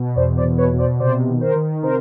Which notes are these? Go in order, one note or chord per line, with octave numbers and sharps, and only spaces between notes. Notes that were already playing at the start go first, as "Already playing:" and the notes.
Already playing: B2
E2 C5 D5
C5 D5
B2
B4 C#5
B2
C5 D5
C3 C5 D5
D#3
A#4 C5
D#3
C3 A#4 C5